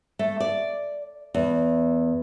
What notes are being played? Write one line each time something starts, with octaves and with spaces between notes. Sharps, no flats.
A3
D5
E2